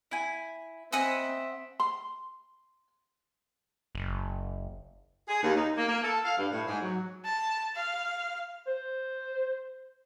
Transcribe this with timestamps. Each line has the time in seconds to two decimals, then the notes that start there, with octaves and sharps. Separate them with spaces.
0.11 E4 G#5
0.92 C4 D#5 E5 F#5 G#5 B5 D#6
1.80 C6
3.95 F#1
5.28 G#4
5.42 D#2
5.56 D#4
5.76 A#3
5.89 A#3
6.03 A4
6.25 F5
6.38 G2
6.52 A2
6.67 G#2
6.82 F#3
7.25 A5
7.76 F5
8.67 C5